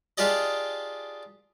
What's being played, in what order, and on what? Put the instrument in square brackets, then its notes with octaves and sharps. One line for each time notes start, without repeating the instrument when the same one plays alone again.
[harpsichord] D4 F4 G4 G#4 D5 D#5